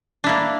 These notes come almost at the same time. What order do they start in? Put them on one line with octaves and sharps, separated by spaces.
D4 E4 A#3